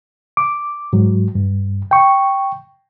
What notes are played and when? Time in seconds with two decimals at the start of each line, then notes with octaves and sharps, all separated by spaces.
0.37 D6
0.93 G#2 F#3
1.35 G2
1.91 G5 C#6